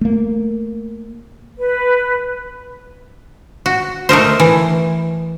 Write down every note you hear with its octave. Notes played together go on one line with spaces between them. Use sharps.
A3 A#3
B4
F#4
A3 D#4 A#4 C5
E3